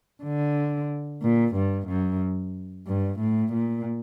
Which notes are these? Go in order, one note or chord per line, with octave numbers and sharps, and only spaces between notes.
D3
A#2
G2
F#2
G2
A2
A#2